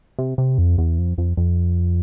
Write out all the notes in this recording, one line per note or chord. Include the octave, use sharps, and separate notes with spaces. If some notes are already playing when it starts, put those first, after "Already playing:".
C3
C3
F2
E2
F2
F2
F2